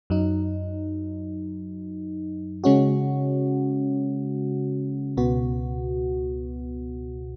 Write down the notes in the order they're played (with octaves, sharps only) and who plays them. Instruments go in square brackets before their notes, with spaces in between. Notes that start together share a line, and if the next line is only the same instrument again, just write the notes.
[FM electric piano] F#2 F#3 D#4
C#3 G#3 C#4 F#4
C#2 B2 B3 F#4